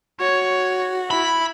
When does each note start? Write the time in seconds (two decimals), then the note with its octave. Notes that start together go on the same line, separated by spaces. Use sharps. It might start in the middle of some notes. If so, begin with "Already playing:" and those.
0.20 F#4 C#5
1.11 E4 B5